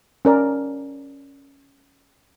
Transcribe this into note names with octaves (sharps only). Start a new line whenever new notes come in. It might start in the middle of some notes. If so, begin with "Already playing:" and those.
C#4 A#4 D5